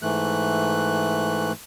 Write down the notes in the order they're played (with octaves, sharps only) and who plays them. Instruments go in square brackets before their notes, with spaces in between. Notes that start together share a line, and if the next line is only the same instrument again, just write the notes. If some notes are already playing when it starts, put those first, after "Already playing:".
[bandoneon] G#2 E3 A3 F#6